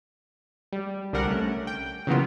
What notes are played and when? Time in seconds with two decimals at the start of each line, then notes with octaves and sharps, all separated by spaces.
0.72 G3
1.13 C2 D3 G3 A#4 F#5
1.28 A3 C#4
1.67 G5
2.07 C#3 E3 F#3 A#3 B3 F4